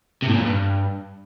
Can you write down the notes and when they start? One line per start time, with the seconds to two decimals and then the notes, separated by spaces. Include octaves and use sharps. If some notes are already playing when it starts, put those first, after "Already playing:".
0.22 C3
0.28 A2
0.34 A#2
0.40 F2
0.46 G2